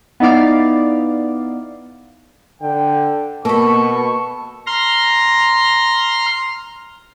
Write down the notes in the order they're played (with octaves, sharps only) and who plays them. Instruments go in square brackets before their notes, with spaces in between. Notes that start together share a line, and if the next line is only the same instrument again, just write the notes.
[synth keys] B3 D#4 E4 D5 F5
[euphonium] D3 [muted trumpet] G5
[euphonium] B2 [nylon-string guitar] A#3 [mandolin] A4 B5 [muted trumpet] C#6
[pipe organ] A#5 C6 F6